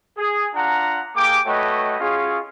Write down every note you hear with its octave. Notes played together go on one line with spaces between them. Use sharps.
G#4
D4 F4 F#5 A#5
A#3 G#4 G5 D6
A3 F#4 B4 C#5 D#5 G5
C#4 F4 F#4 G#4